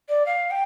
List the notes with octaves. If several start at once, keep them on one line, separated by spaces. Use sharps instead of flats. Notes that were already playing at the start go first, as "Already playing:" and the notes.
D5
F5
G5